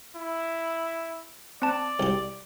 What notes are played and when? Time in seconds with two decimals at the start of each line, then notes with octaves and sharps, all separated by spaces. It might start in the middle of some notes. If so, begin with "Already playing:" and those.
0.16 E4
1.62 C4 D5 A5
2.00 C2 G4